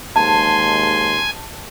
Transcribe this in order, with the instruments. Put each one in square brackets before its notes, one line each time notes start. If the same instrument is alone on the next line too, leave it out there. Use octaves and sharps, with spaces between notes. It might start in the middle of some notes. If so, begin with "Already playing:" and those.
[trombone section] D#2 G#2 G#3 [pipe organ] G#5 [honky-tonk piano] A5 [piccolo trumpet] C6